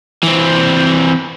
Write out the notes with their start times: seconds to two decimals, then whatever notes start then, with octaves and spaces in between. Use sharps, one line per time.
0.23 E3 C4